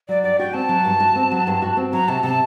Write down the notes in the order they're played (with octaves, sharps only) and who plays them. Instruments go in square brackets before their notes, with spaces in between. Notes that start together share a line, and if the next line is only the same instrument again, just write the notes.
[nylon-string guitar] F#3 [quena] D5
[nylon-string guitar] G2 [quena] D5
[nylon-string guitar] F#4 [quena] G5
[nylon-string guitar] C4 [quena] A5
[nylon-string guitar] F#3
G2
F#4
C4
F#3
G2
F#4
C4
[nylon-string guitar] F#3 [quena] A#5
[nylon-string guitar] C3 [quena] A5
[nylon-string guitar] C3 [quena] A5